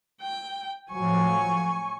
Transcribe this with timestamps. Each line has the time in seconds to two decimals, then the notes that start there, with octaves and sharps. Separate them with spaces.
0.22 G5
0.91 A2 F3 F#3 G#5 C#6